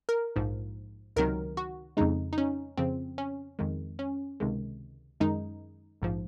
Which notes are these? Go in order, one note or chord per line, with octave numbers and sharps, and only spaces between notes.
A#4
A#1 G#2 F3
C#2 C3 D#3 F#3 A#4
F#4
F2 C#3 G#3 D#4
D#4
C#4
F2 C#3 F3 C4
C#4
F2 D#3 G#3
C#4
C#2 C3 D#3 G#3
F#2 D#3 G#3 D#4
A#1 G#2 F3